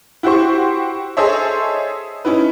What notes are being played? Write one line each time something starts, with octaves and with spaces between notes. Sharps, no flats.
E4 F#4 G4 C5 C#6
G#4 A4 C5 C#5 D#5 E5
C#4 D#4 E4 B4